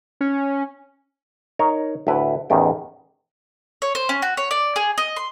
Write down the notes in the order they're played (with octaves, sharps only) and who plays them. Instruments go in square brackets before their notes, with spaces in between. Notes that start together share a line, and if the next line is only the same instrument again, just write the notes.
[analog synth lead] C#4
[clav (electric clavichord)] D#4 A#4 C#5
D2 A2 E4 B4
A1 E2 D#3 G5
[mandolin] C#5
C5
C#4
F#4
C#5
D5
G#4
D#5
C6